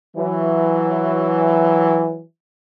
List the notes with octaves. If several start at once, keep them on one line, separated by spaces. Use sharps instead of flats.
E3 F#3